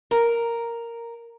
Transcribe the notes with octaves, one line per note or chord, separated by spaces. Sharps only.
A#4